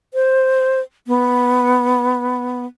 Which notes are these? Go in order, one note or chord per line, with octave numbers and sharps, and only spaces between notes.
C5
B3